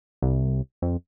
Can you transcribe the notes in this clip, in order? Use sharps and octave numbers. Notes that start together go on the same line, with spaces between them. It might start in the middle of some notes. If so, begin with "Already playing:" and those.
C2
F2